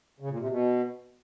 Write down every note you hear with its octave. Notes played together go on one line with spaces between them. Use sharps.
C#3
A#2
C3
B2